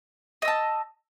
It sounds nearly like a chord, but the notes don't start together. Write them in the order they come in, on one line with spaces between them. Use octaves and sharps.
D#5 E6 A5